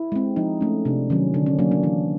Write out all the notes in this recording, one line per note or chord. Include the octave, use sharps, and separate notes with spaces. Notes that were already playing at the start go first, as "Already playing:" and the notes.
Already playing: E4
G#3 C4
F3 D#4
A3 C#4
C3 D4
D#3 F#3 C#4
D3 D4
C#4
F#3 A#3 D4
D4
E3 D4